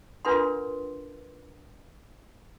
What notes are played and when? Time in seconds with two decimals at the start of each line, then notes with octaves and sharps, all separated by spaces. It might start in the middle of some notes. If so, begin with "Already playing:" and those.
0.25 D4 F4 A#4 B4 F#5 C6